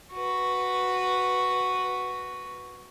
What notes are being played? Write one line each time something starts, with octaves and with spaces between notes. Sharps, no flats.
F#4 B4